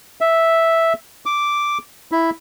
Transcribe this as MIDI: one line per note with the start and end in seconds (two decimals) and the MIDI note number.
0.21 0.93 76
1.26 1.78 86
2.12 2.30 64